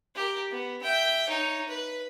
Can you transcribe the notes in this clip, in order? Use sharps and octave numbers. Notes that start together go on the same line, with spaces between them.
G4 A#4
B3
E5 G5
D#4 C#5
B4